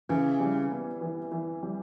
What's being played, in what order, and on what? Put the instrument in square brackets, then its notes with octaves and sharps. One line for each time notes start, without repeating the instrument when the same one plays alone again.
[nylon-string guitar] C#3 [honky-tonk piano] E3
[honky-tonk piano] G3
B3
E3
E3
G3